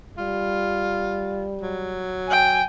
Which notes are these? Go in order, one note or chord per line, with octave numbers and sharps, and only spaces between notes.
G3 F4
F#3
G5 G#5